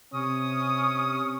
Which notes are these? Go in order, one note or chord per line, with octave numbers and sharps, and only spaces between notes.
C3 C#4 D#6